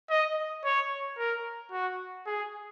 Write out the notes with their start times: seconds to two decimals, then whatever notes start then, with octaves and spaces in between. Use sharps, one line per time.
0.10 D#5
0.65 C#5
1.18 A#4
1.72 F#4
2.26 G#4